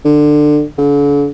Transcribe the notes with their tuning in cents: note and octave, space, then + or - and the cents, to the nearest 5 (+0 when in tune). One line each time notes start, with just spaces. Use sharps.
D3 +20
D3 -40